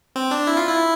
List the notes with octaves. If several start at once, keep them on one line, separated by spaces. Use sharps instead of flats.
C4
D4
E4
F4
E4